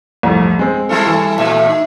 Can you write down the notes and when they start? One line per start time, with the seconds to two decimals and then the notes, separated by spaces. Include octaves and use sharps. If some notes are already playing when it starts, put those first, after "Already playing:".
0.23 C2 F2 A2
0.59 G#3 C4
0.89 G3 E4 A4
1.06 E3
1.38 A#2 A3 E5
1.69 D#4